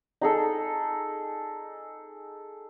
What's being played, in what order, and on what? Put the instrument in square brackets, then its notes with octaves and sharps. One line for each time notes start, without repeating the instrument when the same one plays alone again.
[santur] D#4 G#4 A4